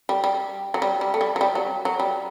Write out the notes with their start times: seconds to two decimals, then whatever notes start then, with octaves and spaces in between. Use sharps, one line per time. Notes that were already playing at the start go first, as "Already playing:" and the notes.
0.09 G3
0.24 G3
0.74 F#3
0.82 G3
1.01 G3
1.14 A3
1.21 G3
1.36 F#3
1.41 G3
1.55 F#3
1.85 F#3
2.00 G3